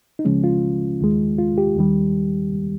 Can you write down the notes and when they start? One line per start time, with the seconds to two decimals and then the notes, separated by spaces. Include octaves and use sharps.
0.19 D#4
0.25 C#2 C#3 F3 G#3 C#4
0.44 F4
1.01 D#2 D#3 G#3
1.38 F4
1.58 G4
1.76 D#2 D#3 G3